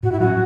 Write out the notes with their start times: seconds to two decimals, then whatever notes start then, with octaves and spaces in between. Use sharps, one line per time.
0.03 A2 F#4
0.12 E4
0.20 F#3 C#4 F#4